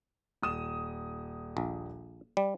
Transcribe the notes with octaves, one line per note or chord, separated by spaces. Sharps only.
D#1 D#6 E7
A#1
G3